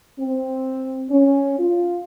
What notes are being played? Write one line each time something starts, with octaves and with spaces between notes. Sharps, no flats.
C4
C#4
F4